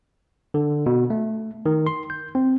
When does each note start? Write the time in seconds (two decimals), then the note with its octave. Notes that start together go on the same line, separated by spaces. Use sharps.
0.54 D3
0.86 B2
1.10 A3
1.66 D#3
1.87 C6
2.10 G6
2.35 C4